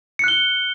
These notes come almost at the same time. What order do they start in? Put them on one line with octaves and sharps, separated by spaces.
C#7 F#6 G7